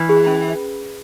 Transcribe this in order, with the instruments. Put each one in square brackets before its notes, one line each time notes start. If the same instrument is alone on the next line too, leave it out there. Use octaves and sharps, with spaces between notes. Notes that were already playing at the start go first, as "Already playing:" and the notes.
Already playing: [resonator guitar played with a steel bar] E3 [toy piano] B4
[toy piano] G#4
C#4